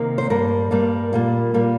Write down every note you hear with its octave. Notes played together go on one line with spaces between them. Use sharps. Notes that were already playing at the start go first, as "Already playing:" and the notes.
Already playing: C3 D#3 A#3
C5
G2 G3 A#3 A#4
G2 G3 A#3
A#2 G3 A#3
A#2 G3 A#3